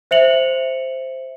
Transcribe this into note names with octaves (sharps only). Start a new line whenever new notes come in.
C5 E5 C#7 F7 F#7